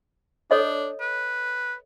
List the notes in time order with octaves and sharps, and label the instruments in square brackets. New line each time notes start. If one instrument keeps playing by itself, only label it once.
[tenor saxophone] D4 [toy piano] A4 C#5 D#5
[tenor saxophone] B4